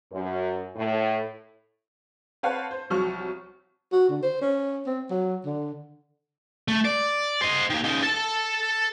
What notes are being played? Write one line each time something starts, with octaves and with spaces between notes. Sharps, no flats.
F#2
A2
C4 B4 C#5 F5 F#5 A5
C5
C2 F3 F#3 C#6 F6
F#4
D3
C5
C#4
C4
F#3
D3
A3
D5
C5 D#5
D#3 A#3
C#3 D#4
A4 A5